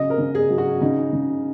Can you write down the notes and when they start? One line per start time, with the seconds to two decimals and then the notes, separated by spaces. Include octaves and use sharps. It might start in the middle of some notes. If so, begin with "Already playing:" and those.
Already playing: C#3 F#3 D#5
0.10 A#4
0.18 C#3
0.35 G#4
0.50 F#3
0.58 F#4
0.81 C#3 D#4
1.13 C#3